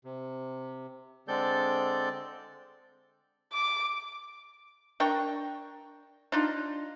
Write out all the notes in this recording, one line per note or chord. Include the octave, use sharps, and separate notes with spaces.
C3
D3 G#3 C4 A4 D5 G6
D6
D4 A#4 G5 C#6
D4 D#4 F4